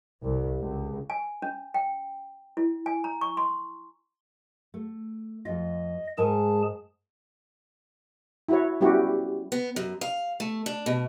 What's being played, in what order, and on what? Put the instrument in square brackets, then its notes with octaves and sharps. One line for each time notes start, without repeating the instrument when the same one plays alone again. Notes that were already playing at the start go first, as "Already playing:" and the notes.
[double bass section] C2
C#2
[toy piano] G#5
C#4
G5
E4
G#5
A#5
C#6
C6
[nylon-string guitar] A3
[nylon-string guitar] F2 F4 [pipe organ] D#5
[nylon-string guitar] G#2 A#4 G#5 [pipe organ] G#3 G#4 A5
[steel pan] E4 F#4 C#5
G3 B3 C#4 E4 F#4 G4
[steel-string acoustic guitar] B3
F#2
F5
A3
D4
B2